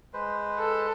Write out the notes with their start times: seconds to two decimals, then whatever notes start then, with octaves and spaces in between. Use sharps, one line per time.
0.13 G#3 B4 C5
0.58 A4